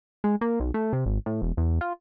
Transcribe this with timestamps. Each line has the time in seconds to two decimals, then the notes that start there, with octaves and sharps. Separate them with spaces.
0.24 G#3
0.41 A#3
0.60 B1
0.74 A3
0.93 C3
1.06 G#1
1.26 A2
1.42 E1
1.57 E2
1.81 F4